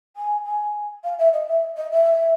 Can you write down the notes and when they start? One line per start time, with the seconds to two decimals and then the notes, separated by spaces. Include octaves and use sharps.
0.16 G#5
0.45 G#5
1.04 F5
1.19 E5
1.33 D#5
1.48 E5
1.77 D#5
1.91 E5